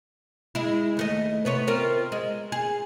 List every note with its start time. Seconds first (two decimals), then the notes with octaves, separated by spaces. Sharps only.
0.55 G#3 E4
0.97 D#2 A3 D#5
1.45 C3 B3 C#5
1.67 C4 F4 A#4
2.12 G#3
2.52 G#4